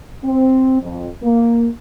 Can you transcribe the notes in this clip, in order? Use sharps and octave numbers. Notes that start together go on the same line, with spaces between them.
C4
F2
A#3